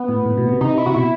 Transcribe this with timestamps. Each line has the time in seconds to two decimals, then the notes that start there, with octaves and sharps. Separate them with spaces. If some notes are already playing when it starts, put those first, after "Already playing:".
Already playing: B3
0.09 A2
0.26 A2
0.38 B2
0.49 C3
0.61 C3 D#4
0.78 E4
0.86 C3 F#4
0.94 B2 E4